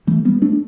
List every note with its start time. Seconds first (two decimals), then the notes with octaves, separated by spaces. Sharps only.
0.07 E3 A3
0.25 G3 B3
0.42 A3 D4